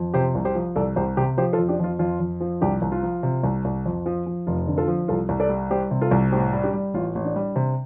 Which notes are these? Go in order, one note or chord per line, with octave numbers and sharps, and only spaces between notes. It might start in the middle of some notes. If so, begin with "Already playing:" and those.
Already playing: F2
C3 G4 C5
C2
G4 C5
F3
C2 A4 D5
C2 G4 C5
C3 G4 C5
F3 G4 C5
F4 A4
F2
D4 G4
F2 F4
F2 F4
F2
F3
C2 D4 G4
C2
F4
F3
C3
C2
C2
F2
F3
F3
F1 F4
D3
F4 A4
F3
C2 F4 A4
C2
A4 D5
G3
G3 G4 C5
C3
F4 A4
C2
A2 G4 C5
G3
D4 G4
G3
A1 F4
A1
D4
G3
C3